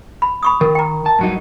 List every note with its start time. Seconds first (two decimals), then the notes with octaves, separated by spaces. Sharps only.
0.22 B5
0.43 B5 C#6 D#6
0.61 D#3 A#4
0.75 G5 A#5
1.06 A5
1.19 G2 F#3 D#4